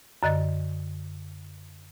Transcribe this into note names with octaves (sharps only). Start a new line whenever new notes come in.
F#2 D3 D#5 A6